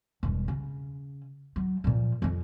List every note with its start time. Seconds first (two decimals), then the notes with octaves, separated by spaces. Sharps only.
0.23 E1 G2
0.48 C#3
1.56 F#3
1.84 A#2 F3
2.22 F2 F3